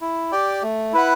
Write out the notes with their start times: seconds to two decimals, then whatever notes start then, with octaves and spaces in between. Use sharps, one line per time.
0.01 E4
0.32 G4 D5 G5
0.63 A3
0.93 E4 B4 F#5